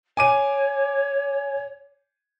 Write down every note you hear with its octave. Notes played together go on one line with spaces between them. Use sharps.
C#5 G#5 D6 D#7